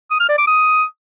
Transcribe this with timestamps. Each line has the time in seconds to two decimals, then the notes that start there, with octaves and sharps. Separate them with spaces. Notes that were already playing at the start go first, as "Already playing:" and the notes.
0.11 D#6
0.20 F6
0.29 D5
0.38 D6
0.47 D#6